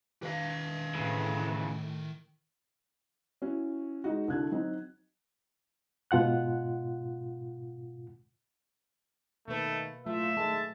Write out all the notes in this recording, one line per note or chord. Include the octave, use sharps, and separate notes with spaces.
D#3 B4 D5 F5
A2 C#3 E3
C#4 E4 F#4
G#3 D#4 F#4
C2 D3 F#4 A4 F#6 G#6
F#3 C4 D#4
G#2 B2 F4 F#5 F#6
B2 D#3 A3 A#3 B4
A2 F#3 A3 F4 E5
D#3 G#3 A3 A5